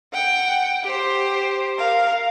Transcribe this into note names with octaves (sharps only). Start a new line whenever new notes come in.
F#5 G5
G4 C5
A#4 F5